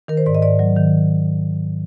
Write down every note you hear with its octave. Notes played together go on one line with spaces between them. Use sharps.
D#3 A#4
C5
G#2 D5
D#5
G#2 D5
F#3
D#3